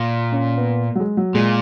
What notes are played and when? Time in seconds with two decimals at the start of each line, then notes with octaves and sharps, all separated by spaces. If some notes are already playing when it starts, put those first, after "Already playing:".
Already playing: A#2
0.32 C#4
0.57 B3
0.96 F#3
1.00 G#3
1.17 F#3
1.35 A#2 G#3